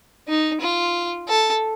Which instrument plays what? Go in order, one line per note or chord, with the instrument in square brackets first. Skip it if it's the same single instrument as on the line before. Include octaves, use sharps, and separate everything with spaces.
[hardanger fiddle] D#4
F4
A4